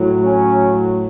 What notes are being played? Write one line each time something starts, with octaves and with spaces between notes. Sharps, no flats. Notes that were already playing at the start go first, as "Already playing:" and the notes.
Already playing: A2 F#3
C#4